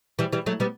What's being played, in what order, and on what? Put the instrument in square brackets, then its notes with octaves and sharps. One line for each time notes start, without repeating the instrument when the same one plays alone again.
[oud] E3 G3
E3 G3
F#3 A3
G3 B3